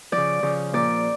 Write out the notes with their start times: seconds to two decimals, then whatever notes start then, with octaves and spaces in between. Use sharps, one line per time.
0.12 C#3 F3 D5
0.43 C#3 F3
0.73 A#2 F3 D5